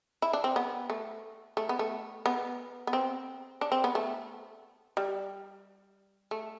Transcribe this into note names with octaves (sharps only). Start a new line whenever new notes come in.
E4
D4
C4
B3
A3
A3
B3
A3
B3
B3
C4
D4
C4
B3
A3
G3
A3